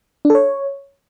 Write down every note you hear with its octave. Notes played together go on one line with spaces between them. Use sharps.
D4
A4
C#5